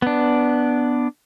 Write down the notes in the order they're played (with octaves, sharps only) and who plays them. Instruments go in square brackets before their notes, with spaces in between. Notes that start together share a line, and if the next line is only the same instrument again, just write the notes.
[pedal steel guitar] B3 D4